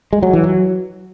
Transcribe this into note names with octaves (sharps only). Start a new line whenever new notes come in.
G#3
F#3
E3
F#3